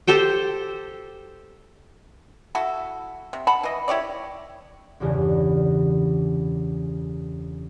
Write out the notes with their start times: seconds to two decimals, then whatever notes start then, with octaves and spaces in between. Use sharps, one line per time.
0.08 G4 A4 C5 G5
2.55 E4 F#4 A4
3.33 C3
3.47 F#5 A5 B5
3.63 E3 D#5
3.88 E4 G4 C#5 D5
5.00 G1 E2 G2 C#3 E3